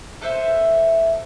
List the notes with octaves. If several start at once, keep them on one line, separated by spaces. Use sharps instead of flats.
A4 B4 C5 E5